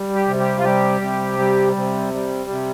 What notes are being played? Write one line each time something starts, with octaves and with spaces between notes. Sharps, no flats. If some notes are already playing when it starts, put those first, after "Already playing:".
Already playing: G3
G4
C3
G4
F4
G3 G4
C3
G3
C3
G3
C3